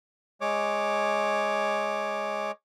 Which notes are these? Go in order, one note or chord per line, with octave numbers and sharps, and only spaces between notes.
G#3 C#5 D6